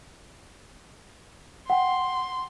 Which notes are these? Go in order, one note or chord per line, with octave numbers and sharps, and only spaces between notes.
F#5 G5 C6